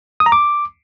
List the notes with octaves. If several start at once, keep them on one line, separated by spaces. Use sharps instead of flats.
D#6
A#5
D6